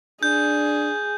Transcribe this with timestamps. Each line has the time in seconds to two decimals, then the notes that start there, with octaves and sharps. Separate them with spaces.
0.23 D4 G#4 G6